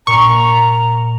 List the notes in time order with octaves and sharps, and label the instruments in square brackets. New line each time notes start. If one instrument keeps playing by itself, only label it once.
[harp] A#2 [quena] A#5 [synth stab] C#6